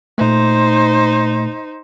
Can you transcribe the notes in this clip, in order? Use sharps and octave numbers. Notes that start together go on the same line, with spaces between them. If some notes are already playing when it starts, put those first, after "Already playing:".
A#2 A3 D#4 C5